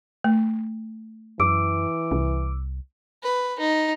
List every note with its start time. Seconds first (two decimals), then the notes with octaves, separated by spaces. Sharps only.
0.24 A3
1.40 F#2 E3 D6 E6 D7
2.11 C2
3.23 B4
3.60 D#4